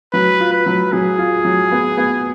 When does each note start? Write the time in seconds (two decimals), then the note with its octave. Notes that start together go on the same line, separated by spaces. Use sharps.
0.13 F#3 B4
0.40 F4
0.53 B4
0.66 F#3
0.93 F#3 G#4
1.18 F4
1.45 F#3
1.71 B3
1.97 B3